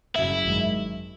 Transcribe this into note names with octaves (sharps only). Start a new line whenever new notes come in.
F#1 F#2 C#3 F#3 E4
G#1 F#2 D#3 G#3